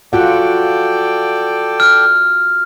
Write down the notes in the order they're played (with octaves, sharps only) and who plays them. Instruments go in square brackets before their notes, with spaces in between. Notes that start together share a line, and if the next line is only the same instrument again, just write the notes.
[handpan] F4 F#4 F#5 [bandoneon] A4 D5 G5
[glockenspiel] F6